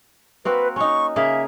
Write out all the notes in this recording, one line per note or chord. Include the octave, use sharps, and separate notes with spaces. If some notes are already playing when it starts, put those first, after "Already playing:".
A#3 C4 F#4 B4
C#4 D#4 C#6
C#3 A#3 G#4 E5